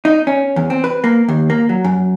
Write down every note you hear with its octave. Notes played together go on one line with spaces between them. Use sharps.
D#4
C#4
E2
C4
B4
A#3
D#2
A#3
F#3
F#2